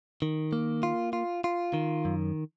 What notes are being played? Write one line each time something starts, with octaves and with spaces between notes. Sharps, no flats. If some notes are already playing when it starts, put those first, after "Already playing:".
D#3
A#3
F4
F4
F4
D#3
F#2